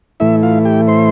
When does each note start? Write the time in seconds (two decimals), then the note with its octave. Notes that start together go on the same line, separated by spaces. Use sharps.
0.20 A2 E3 A3 E4 E5
0.43 F4 F5
0.65 G4 G5
0.88 C5 C6